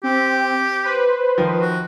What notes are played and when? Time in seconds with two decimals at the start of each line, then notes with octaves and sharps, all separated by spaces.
0.03 C4 G4
0.84 B4 C5
1.38 D#3 F3
1.61 F#4